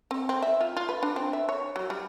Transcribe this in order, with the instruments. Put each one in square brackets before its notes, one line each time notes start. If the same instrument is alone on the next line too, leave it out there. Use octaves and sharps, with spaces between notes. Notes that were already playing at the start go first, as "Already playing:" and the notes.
[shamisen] C4
C4
E5
F4
F4
B4
D4
C4
E5
C#5
F#3
G3